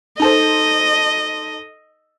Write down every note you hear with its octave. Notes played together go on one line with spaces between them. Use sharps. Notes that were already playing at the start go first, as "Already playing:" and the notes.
D#4 A4 C5 D#5